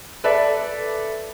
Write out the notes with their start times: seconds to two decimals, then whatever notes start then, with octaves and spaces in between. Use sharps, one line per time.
0.24 A4 B4 D5 E5